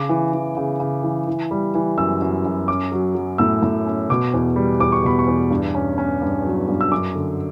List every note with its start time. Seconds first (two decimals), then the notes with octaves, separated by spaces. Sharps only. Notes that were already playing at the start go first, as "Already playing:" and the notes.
Already playing: C#3 D6
0.09 E3
0.33 E3
0.57 C#3
0.80 C#3
1.03 E3
1.27 E3
1.51 G3
1.75 E3
1.98 F#2 E6
2.22 F#2
2.45 F#2
2.68 C#4 D6
2.92 F#3
3.15 F#3
3.38 A2 E6
3.62 A2
3.86 C#4
4.10 B2 D6
4.34 E2
4.56 G3
4.80 E2 D6
4.92 C#6
5.03 B2 B5
5.19 C#6
5.27 E2
5.50 G2
5.75 C#4
5.98 C#4
6.22 G2
6.45 F#3
6.68 G2
6.81 E6
6.91 F#2 D6
7.15 D3